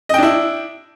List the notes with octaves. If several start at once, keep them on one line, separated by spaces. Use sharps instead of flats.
D4 E4 D#5 G5